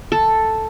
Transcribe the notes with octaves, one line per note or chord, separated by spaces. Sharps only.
A4